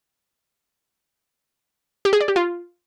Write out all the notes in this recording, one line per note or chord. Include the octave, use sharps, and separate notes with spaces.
G4
G#4
D5
G4
F4